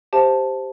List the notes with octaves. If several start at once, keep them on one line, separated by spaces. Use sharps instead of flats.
G4 C5 E5 A5